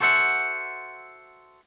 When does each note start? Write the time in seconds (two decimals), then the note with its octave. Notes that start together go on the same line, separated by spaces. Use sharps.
0.01 F#4 A4 C5 E5 F#5